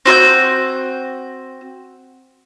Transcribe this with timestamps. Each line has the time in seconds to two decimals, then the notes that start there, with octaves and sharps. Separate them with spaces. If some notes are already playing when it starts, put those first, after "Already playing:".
0.06 C4 F#4 C6 G6